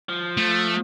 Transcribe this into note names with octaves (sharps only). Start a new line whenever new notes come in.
F3
A3